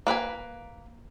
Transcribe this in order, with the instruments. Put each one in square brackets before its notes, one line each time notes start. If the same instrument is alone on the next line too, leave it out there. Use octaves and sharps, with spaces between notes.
[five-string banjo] A#3 B4 C5 G#5